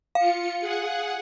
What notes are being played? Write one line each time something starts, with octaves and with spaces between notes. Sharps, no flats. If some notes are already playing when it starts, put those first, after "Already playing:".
F4 F5 C#7
G#4 F#5